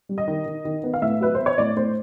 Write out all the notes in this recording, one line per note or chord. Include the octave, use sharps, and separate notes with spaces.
G3
D#5
D#3
D#3
D#3
B3
F5
A2 E5
F#3 B4
B3 C5
C#5
A2 D5
A2 C5